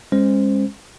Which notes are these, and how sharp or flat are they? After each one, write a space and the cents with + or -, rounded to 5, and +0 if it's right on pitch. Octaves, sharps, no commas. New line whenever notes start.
G#3 -25 C#4 -35 C5 -10